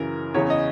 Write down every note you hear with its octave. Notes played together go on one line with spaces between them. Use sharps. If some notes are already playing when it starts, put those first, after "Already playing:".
Already playing: F#2 C#3 E3 A#4
E2 C#3 E3 C#5
D#5